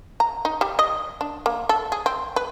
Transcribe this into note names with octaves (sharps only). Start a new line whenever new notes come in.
A#5
D#4
G3
D#5
D4
A#3
A4
G#4
C4
B4